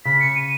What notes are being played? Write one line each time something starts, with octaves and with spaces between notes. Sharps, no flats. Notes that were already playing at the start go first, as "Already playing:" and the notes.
C#3 B6
C#7
D#7